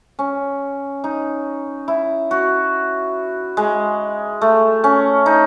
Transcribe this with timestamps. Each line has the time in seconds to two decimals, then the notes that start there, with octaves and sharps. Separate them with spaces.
0.19 C#4
1.04 D#4
1.88 E4
2.31 F#4
3.57 G#3
4.41 A3
4.84 C#4
5.26 D#4